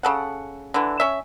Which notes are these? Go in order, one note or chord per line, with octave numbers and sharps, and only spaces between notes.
C#3 A4 F#5
D3 E3
C#4 E5